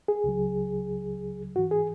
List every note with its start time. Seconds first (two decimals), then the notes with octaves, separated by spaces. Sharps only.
0.08 G#4
0.24 C#2 C#3 F#3
1.55 G#2 E3 F#4
1.71 G#4